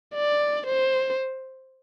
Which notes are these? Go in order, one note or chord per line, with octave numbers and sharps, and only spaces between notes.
D5
C5